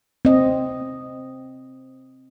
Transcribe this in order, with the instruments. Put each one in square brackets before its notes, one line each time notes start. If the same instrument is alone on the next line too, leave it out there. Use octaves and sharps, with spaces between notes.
[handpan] C4 D#5